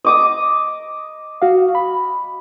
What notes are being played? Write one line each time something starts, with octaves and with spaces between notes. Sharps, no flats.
D#5 D6 D#6
F#4 F5
B5